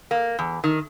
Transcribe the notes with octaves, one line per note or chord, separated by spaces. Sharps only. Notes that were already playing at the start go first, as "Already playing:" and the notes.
A#3
E2
D#3